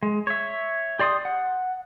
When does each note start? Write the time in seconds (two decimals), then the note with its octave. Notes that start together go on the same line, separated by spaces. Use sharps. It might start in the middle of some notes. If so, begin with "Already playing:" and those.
0.03 G#3
0.27 C#5 E5
0.99 G4 D5 C6 D6 D#6
1.25 F#5